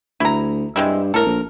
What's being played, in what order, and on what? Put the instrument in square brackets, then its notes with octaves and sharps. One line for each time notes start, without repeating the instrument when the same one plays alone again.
[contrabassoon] D2 [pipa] E4 A#5
[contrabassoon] G2 [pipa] G#3 C4 E4
[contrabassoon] A2 [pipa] A4 A#4
[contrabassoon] A#1